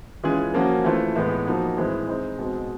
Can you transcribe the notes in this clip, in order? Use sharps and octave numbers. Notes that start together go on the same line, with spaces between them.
E3 G#3 C#4 F4 G#4
F3 A#3 C#4 F#4
E3 A3 C4 F4
A2 E3 G#3 B3
F3 A#3 D#4 F#4
A2 E3 G#3 C4
G#3 C4 D#4
B2 G#3 C4